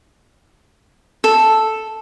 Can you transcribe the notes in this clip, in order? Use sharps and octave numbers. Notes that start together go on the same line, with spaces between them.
A4